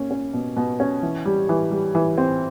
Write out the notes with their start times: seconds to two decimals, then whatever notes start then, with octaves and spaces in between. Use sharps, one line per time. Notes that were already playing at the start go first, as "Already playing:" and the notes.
Already playing: A#3 C#4
0.11 C#4
0.33 B2
0.57 B2
0.80 C#4
1.02 E3
1.25 G3
1.49 E3
1.71 G3
1.95 E3
2.18 C4